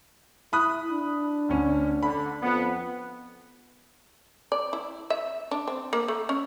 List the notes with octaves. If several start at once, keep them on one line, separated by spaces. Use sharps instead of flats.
E4 B5 D#6 F#6
D4
D2 C#4
D3 B5
F2 B3
D5
E4
E5
D4
C4
A#3
A3
C#4